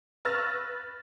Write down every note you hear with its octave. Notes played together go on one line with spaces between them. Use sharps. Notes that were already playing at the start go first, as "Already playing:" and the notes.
B4 C#6 E6 F6 A6 A#6